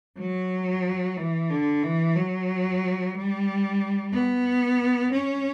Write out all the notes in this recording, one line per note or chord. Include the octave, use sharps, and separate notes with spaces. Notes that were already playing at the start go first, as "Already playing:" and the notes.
F#3
E3
D3
E3
F#3
G3
B3
C#4